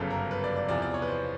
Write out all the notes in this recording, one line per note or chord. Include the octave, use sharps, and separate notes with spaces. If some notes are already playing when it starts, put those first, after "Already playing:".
Already playing: G1 F#2 C#3 A4
A#4
B4
D5
D5
E2 C3 F3 D5
D5
C#5
B4
C5